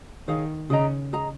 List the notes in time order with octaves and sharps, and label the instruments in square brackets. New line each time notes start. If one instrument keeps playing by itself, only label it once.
[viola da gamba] D#3 [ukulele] G#4 C#5 F5
[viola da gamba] C#3 [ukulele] G#4 D#5 A#5
[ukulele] G#4 D#5 A#5